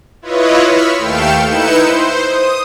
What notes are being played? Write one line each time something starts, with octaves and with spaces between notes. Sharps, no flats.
E4 F4 B4 C#5 D#5
B5 C#6 E6 F6 B6
D#2 A3 F5 G5 C#7 E7
D#4 E4 B4 G6 C#7 E7
C5
D#6